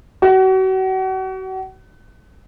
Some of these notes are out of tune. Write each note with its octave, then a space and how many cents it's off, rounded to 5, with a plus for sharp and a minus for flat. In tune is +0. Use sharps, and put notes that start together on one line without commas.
F#4 +35